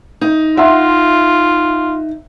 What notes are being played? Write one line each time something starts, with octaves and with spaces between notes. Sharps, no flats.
D#4
F4 E5 F#5 C6